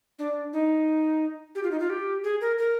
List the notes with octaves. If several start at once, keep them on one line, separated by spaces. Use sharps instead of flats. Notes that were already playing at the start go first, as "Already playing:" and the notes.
D4
D#4
G4
F4
D#4
F4
G4
G#4
A#4
A#4